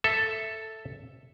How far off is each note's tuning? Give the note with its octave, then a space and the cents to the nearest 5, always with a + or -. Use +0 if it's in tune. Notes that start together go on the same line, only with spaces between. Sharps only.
A4 +0 E5 +0